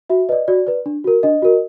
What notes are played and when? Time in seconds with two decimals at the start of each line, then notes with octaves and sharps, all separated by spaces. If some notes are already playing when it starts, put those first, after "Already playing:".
0.10 F#4 E5
0.29 B4 D5 D#5
0.48 F#4 D5
0.67 B4 D5
0.86 D4
1.04 F#4 A#4
1.23 D4 D#5
1.42 F#4 A#4